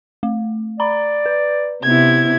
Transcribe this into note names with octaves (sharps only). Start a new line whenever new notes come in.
A3
D5 A#5 B5
B4
C3 B3 E4 G#6